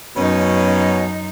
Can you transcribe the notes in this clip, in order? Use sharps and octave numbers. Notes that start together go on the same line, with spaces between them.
F#2 B2 C#4 D#4